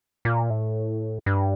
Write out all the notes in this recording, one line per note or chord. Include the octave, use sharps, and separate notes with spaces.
A#2
A2
G2